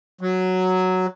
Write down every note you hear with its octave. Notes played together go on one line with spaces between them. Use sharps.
F#3